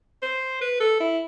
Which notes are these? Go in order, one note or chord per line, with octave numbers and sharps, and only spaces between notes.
C5
B4
A4
E4